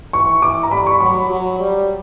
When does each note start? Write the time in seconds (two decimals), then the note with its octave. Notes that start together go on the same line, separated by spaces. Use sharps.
0.13 E3 C#6
0.42 E3 D6
0.63 A#5
0.71 G3 B5
0.86 C#6
1.00 F#3 B5
1.30 F#3
1.60 G3